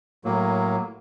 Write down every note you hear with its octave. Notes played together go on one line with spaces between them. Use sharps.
A2 F#3 A#3